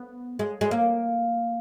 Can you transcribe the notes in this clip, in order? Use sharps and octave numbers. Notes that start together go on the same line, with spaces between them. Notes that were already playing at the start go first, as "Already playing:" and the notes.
Already playing: B3
G#3
G#3
A#3